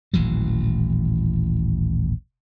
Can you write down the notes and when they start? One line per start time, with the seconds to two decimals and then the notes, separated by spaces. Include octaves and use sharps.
0.14 D#1 A1 E3 F#3